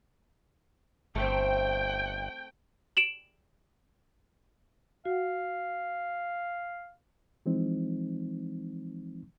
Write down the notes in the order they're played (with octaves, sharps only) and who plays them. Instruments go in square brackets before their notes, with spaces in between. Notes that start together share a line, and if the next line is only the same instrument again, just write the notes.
[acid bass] G1 [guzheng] A3 C4 [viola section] G5
[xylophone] D7 E7 F#7
[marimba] F#4 F#5 [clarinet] F5
[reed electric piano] E3 F3 G#3 C4 D#4